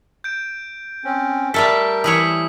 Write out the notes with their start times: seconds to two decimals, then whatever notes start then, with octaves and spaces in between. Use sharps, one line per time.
0.24 G6 D7
1.05 C4 C#4
1.54 G3 A3 A4 A#4 F6 B6
2.04 E3 E4 C#5 D#6 B6 F#7